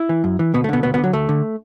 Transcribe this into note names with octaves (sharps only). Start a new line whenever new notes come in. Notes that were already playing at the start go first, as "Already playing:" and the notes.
Already playing: E4
E3
F#2
E3
D2 B2 B3
A3
B2 D3 B3
D2 B2 B3
B2 B3
D3
F#3
D2 A3
D3